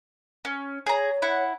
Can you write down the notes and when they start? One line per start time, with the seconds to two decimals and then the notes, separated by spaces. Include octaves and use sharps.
0.45 C#4
0.86 G#4 C#5 A#5
1.22 E4 F#5